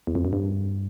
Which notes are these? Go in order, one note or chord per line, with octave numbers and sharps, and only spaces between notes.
E2
F2
F#2
G2